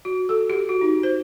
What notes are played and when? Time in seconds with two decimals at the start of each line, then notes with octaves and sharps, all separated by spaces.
0.05 F#4
0.29 A4
0.50 G4
0.69 F#4
0.81 D#4
1.03 C5